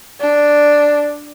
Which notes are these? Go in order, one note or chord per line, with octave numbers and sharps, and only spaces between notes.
D4